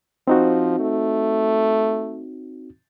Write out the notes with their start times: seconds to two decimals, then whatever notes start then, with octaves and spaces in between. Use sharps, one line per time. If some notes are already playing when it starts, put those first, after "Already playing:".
0.28 F3 C4 D#4 F#4
0.80 A3